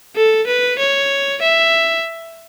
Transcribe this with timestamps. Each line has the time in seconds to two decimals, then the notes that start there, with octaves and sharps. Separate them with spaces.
0.16 A4
0.47 B4
0.79 C#5
1.42 E5